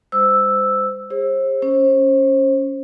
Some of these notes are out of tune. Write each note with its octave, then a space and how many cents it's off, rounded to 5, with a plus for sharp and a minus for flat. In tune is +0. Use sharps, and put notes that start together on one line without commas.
G#3 -45 C5 -20 E6 +0
G#4 -40 C5 +35
C#4 +0 C5 +30